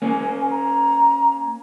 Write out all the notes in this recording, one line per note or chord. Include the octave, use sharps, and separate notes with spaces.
A#3 C#4 G#5
A#5